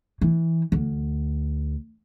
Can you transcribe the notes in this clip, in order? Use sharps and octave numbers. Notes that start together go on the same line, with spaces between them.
E3
D2